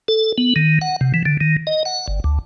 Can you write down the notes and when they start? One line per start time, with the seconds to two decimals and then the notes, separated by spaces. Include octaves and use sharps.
0.08 A4
0.38 B3
0.56 D#3
0.81 F#5
1.01 C3
1.14 E3
1.26 D3
1.41 D#3
1.67 D#5
1.86 F#5
2.08 G1
2.24 D2